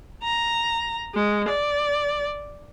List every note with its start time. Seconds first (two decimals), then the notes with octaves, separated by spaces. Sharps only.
0.23 A#5
1.15 G#3
1.49 D5